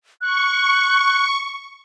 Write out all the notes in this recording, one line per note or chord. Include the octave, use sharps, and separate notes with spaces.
C#6 F#6